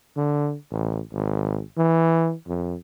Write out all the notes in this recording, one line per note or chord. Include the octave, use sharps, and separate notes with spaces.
D3
A1
G#1
E3
F2